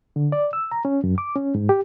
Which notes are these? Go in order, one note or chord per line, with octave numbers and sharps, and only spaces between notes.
D3
D5
E6
A#5
C#4
F#2
D6
C#4
G#2
G4